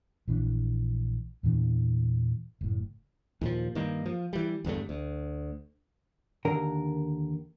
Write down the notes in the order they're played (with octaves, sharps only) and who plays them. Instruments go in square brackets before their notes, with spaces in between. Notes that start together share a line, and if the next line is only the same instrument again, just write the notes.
[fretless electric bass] A#1 E3 C#4 D4
E2 A#2 E3 D4
F#1 A2
[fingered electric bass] D#2 A#2 F3
G2 D#3 A#3
F3
E3 G3
G1 E2 G2 A3
D2
[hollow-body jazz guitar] D#2 D3 A#4